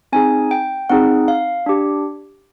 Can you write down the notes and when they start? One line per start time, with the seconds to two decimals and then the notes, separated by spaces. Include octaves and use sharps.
0.12 C4 D#4 G#4 G#5
0.51 G5
0.90 C4 D#4 G#4 F#5
1.28 F5
1.66 D4 G4